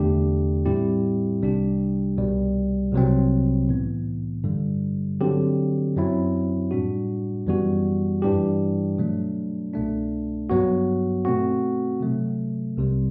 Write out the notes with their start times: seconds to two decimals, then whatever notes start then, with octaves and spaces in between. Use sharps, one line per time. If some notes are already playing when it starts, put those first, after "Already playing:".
Already playing: E2 D3 A3 D4 G4
0.65 A2 G3 C4 E4 G4
1.41 C2 C3 G3 D4 G4
2.18 C2 B2 G3
2.93 C2 C3 F#3 C4
3.69 A2 E3 B3
4.44 G2 D3 G3
5.21 D3 F#3 C4 G4
5.96 F#2 F#3 C4 E4
6.71 A2 G3 D4 F#4
7.47 F#2 E3 G3 B3 F#4
8.22 G2 E3 G3 D4 G4
8.98 B2 F#3 A3 D4
9.74 C2 B2 A3 D4
10.50 G2 F#3 B3 F#4
11.25 B2 A3 C4 F#4
12.00 C3 F#3 A3
12.77 C2 C3 G3